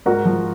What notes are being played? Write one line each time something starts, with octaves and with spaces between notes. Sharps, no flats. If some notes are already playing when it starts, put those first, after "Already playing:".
G#2 F#4 A#4
F3